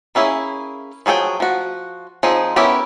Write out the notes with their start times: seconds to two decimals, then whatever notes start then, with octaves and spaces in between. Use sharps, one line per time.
0.15 A#3 C#4 E4 G#4
1.06 F3 F#3 G#4 A4 G5
1.40 F3 F#4
2.23 F3 C4 D#4 G#4
2.56 B3 C#4 E4 G4 A#4